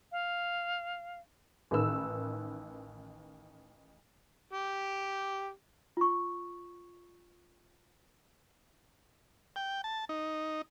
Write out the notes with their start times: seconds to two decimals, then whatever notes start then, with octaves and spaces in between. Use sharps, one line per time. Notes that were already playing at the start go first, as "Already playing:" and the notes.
0.12 F5
1.71 A1 D#3 B4 E6
4.53 G4
5.97 F4 C#6
9.56 G5
9.84 A5
10.09 D#4